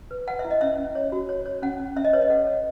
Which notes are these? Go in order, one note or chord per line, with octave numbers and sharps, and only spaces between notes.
B4
B4 F#5
E5
E4
D#5
C#4 E5
C#4
C#5
F#4
C#5
C#5
C#4 F#5
C#4
C#4 E5
D#5
B4 C#5
D#5
A4 F#5
C#5